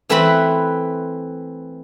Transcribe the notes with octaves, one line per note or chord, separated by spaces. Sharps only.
E3 A3 C4 E4 B4 B5